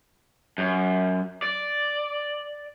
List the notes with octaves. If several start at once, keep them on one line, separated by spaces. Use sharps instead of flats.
F#2
D5